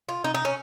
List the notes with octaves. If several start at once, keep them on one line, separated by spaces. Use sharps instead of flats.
F4
D#4
D#4
C#4